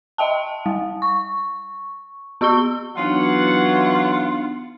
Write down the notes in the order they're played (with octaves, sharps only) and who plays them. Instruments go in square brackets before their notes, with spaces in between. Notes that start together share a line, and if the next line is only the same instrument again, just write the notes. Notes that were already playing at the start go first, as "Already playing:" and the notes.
[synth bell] D#5 E5 G5 A5
G3
C#6
B3 F#4 C#6 E6 G7
[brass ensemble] E3 F#3 F#5 [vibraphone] B3 D4 D#4 [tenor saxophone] F4